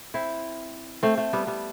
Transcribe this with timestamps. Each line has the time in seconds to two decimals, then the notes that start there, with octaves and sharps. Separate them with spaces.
0.14 C4 E4
1.03 A3 C4
1.17 A3
1.33 G3 B3
1.47 G3 B3